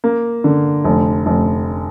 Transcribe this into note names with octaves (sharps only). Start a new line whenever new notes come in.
A#3
D3
F1
F1